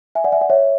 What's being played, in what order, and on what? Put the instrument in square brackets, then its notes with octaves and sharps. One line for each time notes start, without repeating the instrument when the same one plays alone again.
[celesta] E5 G#5
D5 F#5
E5 G#5
D5 F#5
C#5 E5